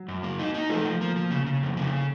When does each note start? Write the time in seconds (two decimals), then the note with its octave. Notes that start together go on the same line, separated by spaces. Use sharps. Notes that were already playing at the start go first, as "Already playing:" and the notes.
Already playing: F#3
0.08 F#2
0.23 A#3
0.39 D#4
0.54 D#4
0.70 F3 A3
0.85 F3
1.01 F3 A#3
1.16 F3
1.31 C#3
1.46 C#3
1.63 F2
1.77 C#3